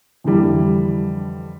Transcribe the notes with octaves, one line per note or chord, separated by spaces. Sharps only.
F2 D3 E3 G3